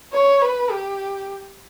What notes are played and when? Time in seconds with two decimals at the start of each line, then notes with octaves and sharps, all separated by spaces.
0.13 C#5
0.42 B4
0.71 G4